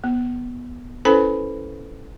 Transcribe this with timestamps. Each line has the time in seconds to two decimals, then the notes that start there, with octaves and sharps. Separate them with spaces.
0.04 B3
1.05 C#4 E4 A4 B4 C5 B5